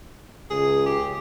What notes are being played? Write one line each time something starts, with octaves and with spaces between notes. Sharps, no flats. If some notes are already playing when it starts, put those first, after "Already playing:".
C#2 G#4
G4